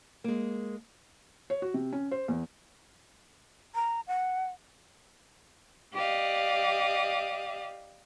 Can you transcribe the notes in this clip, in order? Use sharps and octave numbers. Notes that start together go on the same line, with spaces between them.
G#3 A#3
C#5
F#4
C3
C#4
C5
E2
A#5
F#5
G4 D5 D#5 F5